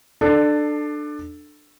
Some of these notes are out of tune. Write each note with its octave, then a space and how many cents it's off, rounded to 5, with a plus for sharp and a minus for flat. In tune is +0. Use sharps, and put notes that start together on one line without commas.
D4 +20 A4 +0